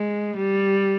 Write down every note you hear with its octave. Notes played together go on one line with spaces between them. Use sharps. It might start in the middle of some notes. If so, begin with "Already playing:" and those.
Already playing: G#3
G3